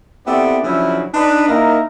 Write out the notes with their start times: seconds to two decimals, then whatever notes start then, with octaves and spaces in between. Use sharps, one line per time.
0.26 B3 C4 E4 G4 A4 D5
0.63 C#3 F3 F#3 D4 E4
1.14 D4 D#4 B4
1.49 A#3 D#4 E4 A#4